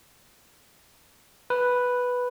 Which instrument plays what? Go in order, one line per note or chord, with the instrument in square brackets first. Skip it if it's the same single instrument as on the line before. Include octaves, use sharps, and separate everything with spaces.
[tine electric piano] B4